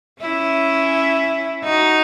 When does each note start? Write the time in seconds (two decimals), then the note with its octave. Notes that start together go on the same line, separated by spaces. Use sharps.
0.21 C#4 E4
1.64 D#4 F#4